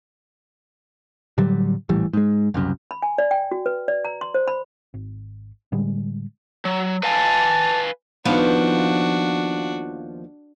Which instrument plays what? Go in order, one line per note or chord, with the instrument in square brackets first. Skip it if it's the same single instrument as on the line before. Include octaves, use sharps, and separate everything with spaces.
[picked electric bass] A2 D3 F#3 G3
A#1 A2 E3 G3
G#2 G#3
F#1 C2 F#2
[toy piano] B5
G#5
D5
G5
F#4
B4
D5
A#5
C6
C5
B5
[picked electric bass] G#1
A2 D3 G3 G#3
[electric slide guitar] F#3
[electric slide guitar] B4 F5 G#5 [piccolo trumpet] A5
[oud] D#2 F3 B3 [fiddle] D4 F#4